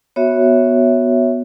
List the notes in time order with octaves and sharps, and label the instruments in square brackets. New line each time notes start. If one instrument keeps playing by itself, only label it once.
[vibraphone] B3 F#4 C#5 E5